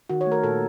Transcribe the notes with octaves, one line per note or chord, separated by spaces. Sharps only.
D#3 F#4
C#5
A3
A#4
A#2 A4